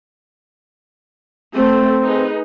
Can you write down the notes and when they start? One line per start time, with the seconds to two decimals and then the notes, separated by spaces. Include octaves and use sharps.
1.55 A3 C4
2.03 D#4 G#4 B4